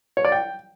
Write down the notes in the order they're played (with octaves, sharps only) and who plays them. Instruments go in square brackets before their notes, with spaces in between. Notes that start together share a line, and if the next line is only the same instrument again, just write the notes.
[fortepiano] C#5
D5
G5